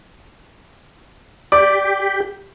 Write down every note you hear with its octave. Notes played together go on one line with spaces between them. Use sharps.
G4 D5